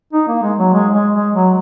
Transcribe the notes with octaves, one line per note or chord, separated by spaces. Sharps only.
D#4
A#3
G#3
F#3
G#3
G#3
G#3
F#3